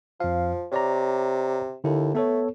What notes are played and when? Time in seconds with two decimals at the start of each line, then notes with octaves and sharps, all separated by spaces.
0.20 F2 F3 F5
0.72 C3 C#5 D5 A#5
1.84 D#2 D3 E4 A4
2.15 A3 B3 A4 C#5